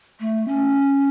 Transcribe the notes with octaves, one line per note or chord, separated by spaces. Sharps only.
A3
C#4